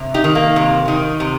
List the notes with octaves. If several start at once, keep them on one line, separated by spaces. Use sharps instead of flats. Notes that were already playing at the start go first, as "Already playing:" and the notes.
Already playing: C3
D#4 G4
D#3
A#3
C3
D#3
C3